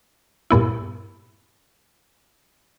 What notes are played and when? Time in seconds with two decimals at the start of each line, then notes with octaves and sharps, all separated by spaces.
0.50 G2 A#2 B3 E4